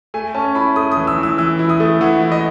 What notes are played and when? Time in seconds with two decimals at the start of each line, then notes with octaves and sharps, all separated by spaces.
0.14 A3 G#5
0.34 C#4 A5
0.55 E4 B5
0.76 A3 D#6
0.92 D#6
0.97 E3
1.07 E6
1.18 E3
1.23 E6
1.38 E3 E6
1.59 E4
1.69 D#6
1.80 A3
2.01 E3 F#5
2.22 E4
2.32 D#5